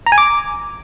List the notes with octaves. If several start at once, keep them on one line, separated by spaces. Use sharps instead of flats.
A#5
G#5
D6